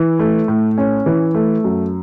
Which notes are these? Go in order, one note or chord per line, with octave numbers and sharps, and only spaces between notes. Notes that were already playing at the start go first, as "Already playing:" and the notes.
Already playing: E3
A3
A2
C#4
E3
A3
F#2